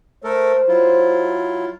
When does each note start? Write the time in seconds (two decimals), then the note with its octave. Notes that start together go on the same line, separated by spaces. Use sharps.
0.24 A3 A4 A#4 C5
0.68 F#3 E4 F4